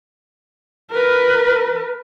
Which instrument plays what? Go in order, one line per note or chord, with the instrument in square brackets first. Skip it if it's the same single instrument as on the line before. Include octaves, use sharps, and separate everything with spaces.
[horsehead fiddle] A#4 B4